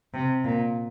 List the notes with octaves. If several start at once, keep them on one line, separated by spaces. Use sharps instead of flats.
C3
A#2